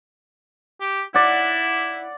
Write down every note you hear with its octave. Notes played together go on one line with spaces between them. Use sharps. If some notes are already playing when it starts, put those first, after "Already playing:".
G4
E4 D5 F#5